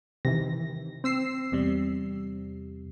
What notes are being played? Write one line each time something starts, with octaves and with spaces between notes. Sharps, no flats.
C3 D#3 E3 A#6
C4 E6 C7
E2 C3 G3